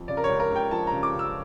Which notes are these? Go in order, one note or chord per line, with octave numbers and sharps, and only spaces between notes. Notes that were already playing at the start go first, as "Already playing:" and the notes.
Already playing: F2
C#3 D5
A#4
C#5
C#2
A#4
C#2
G5
F3 A5
A#5
C#3
D6
C#2
E6